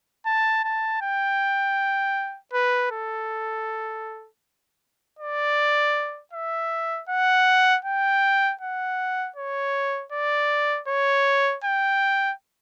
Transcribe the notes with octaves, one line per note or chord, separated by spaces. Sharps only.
A5
A5
G5
B4
A4
D5
E5
F#5
G5
F#5
C#5
D5
C#5
G5